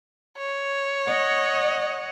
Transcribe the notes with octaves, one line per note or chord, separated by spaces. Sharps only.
C#5
D#5 F#5